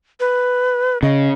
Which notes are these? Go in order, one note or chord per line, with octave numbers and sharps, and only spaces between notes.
B4
C#3 D#5